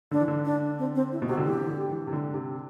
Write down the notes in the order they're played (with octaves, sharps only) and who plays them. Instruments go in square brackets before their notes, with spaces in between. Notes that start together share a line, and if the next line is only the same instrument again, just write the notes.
[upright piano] D3 [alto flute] D4
[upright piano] E3
D3
[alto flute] D4
C4
C4
E4
[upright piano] B2
[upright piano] C3 [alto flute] F#4
[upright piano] D3
[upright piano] E3 [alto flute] G4
[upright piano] D3
E3
C3
D3
C3